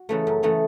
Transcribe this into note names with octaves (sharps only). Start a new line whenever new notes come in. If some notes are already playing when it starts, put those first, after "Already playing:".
Already playing: F#4
C#3 E3 A3
F#2
C#3 E3 A3